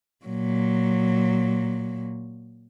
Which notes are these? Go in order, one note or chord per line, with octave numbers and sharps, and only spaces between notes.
A#2 F#3